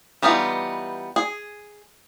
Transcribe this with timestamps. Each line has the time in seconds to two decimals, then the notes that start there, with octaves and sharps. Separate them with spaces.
0.22 E3 G3 B3 D#4 F4
1.16 G#4